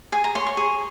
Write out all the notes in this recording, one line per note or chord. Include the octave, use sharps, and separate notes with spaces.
G#4 G#5
A#5
C#5 C6
C#6
G#4